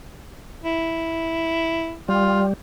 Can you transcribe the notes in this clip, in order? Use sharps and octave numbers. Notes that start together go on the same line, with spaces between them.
E4
G3 F4